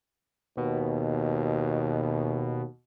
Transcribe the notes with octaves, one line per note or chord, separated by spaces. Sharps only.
D#2 B2